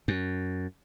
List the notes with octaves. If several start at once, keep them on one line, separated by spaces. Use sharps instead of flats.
F#2